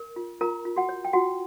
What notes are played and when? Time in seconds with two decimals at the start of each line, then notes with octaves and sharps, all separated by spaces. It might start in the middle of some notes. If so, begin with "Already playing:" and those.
Already playing: A#4
0.16 F4
0.41 F4 A#4 A#5
0.65 F4
0.76 F#4 F#5
0.89 C#5
1.05 G5
1.13 F4 F#4 F#5